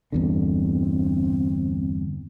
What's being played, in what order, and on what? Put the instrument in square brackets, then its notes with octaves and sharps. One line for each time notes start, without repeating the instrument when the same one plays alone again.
[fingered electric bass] G1 E2 D3 [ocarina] C4